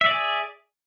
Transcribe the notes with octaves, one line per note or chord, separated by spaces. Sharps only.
G#4 D5 E5